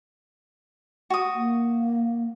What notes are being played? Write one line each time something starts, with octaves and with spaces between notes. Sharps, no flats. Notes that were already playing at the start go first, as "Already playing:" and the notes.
F#4 D#6
A#3